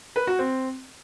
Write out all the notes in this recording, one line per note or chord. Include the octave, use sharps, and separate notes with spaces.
B4
F#4
C4